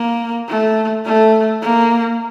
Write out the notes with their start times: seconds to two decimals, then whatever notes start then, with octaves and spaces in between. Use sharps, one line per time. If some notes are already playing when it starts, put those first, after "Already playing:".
Already playing: A#3
0.48 A3
1.06 A3
1.62 A#3